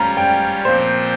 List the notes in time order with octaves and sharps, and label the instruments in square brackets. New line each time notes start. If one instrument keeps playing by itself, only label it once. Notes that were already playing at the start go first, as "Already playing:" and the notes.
Already playing: [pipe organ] G3 C#4 F4 [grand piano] A#5
[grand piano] G5
[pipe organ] A#2 F3 C4 F4 [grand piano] C5